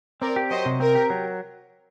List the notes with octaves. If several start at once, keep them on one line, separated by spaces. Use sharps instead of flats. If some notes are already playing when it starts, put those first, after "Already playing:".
C4 A#4 D5
G4
F#3 C5 D#5
C3
C4 A#4
G4
F#3